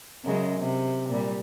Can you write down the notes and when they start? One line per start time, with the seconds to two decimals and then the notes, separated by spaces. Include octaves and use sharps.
0.25 F#2 C#3 G#3
0.59 C3
1.09 A#2 G3